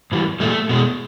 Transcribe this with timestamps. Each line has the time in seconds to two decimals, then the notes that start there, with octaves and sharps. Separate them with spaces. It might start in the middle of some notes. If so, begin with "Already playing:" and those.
0.12 G#2 E3 G3
0.40 A#2 G3 A3
0.69 B2 G#3